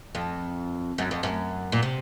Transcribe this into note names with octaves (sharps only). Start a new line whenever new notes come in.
F2
F#2
F2
F#2
A#2
C3